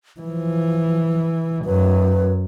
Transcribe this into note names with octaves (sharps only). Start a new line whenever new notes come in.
E3 F3
F#2 B4